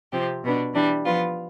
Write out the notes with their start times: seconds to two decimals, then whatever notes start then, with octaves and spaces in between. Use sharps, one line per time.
0.12 C3 F3 C4 G4
0.44 B2 B3 D4
0.73 E3 G3 D4
1.05 F3 B3 F4